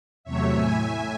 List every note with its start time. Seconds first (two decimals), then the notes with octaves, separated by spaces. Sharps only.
0.24 E2 C3 F#3 A3 C#5 E5
0.52 A2 E5 G#5